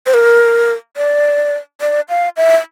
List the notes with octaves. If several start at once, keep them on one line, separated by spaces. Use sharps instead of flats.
C5
A#4
D5
D5
F5
E5